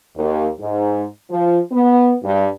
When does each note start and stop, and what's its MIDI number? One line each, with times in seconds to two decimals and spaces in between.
0.17 0.49 39
0.60 1.05 44
1.30 1.60 53
1.72 2.14 59
2.24 2.47 43